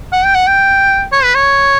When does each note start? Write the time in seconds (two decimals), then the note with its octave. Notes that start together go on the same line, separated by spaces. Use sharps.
0.13 F#5
0.25 G5
0.35 F#5
0.47 G5
1.12 C#5
1.24 B4
1.34 C#5